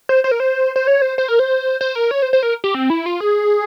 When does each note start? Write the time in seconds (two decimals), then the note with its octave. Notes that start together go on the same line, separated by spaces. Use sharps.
0.09 C5
0.24 C5
0.31 A#4
0.40 C5
0.76 C5
0.87 C#5
1.02 C5
1.18 C5
1.28 A#4
1.39 C5
1.81 C5
1.95 A#4
2.11 C#5
2.22 C5
2.33 C5
2.43 A#4
2.64 G4
2.74 C4
2.90 E4
3.06 F4
3.20 G#4